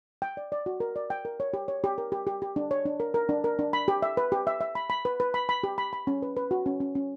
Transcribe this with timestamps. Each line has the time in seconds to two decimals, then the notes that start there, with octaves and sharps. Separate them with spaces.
0.22 G5
0.37 D5
0.52 D5
0.66 F#4
0.80 A#4
0.96 D5
1.10 G5
1.25 A#4
1.40 C#5
1.54 G4
1.68 C#5
1.84 G4
1.98 A#4
2.12 G4
2.27 G4
2.42 G4
2.56 D4
2.71 C#5
2.86 D4
3.00 A#4
3.14 A#4
3.29 D4
3.44 A#4
3.59 D4
3.73 B5
3.88 G4
4.02 E5
4.17 B4
4.32 G4
4.47 E5
4.61 E5
4.75 B5
4.90 B5
5.05 B4
5.20 B4
5.34 B5
5.49 B5
5.64 G4
5.78 B5
5.93 B5
6.07 C#4
6.22 B4
6.37 B4
6.51 F#4
6.66 C#4
6.80 C#4
6.95 C#4